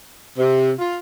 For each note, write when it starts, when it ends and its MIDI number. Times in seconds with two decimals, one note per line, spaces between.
0.37 0.72 48
0.79 0.97 65